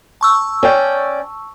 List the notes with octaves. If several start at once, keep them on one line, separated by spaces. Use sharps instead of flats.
A5 C#6 E6
C#4 D5 G5